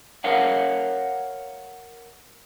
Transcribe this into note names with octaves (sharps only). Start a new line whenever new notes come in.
A#4 C#5 F5 F#5